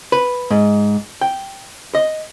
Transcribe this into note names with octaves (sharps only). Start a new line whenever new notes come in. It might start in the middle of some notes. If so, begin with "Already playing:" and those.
B4
G#2
G5
D#5